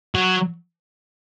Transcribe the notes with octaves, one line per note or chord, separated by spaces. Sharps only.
F#3